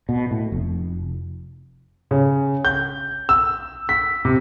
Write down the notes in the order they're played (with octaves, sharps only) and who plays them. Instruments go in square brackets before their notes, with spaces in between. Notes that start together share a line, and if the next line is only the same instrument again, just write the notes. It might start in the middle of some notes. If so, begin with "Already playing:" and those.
[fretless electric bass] B2
A2
F1
[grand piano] C#3
G6
E6
B6
C3